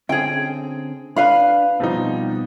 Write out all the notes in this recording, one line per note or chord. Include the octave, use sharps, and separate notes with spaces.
D3 C4 C#4 G#4 G5
D4 B4 F5 B5
B2 F3 G3 B3 C4 D#4